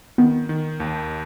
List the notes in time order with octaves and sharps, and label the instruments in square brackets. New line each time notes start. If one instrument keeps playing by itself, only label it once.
[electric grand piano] D#3 [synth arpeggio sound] B3
[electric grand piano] D#3
D#2